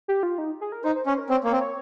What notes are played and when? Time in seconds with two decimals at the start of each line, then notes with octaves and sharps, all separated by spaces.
0.08 G4
0.23 F4
0.38 D#4
0.61 G#4
0.72 A#4
0.84 D#4 C5
0.95 C5
1.06 C#4 C5
1.18 A#4
1.29 C4 C#5
1.44 A#3 C#5
1.52 C4
1.60 C#5